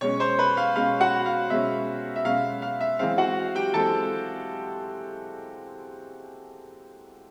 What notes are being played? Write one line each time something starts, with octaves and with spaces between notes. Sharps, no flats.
B2 G#3 C#4 C#5 C#6
C5 C6
B4 B5
F5
B2 G#3 C#4 F5
F#4 F#5
F5
B2 G#3 C#4 E5
E5
B2 G#3 C#4 F5
F5
E5
E3 G#3 C4 F5
F#4 F#5
G4 G5
E3 G#3 C4 A4 A5